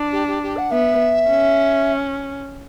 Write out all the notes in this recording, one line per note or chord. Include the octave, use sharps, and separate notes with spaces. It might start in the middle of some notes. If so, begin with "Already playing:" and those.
Already playing: D4
G4
G4
G4
F#5
B3 E5
C#4